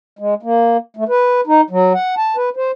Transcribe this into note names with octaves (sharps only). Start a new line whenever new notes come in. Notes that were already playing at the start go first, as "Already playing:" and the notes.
G#3
A#3
A3
B4
D#4
F#3
F#5
A5
B4
C5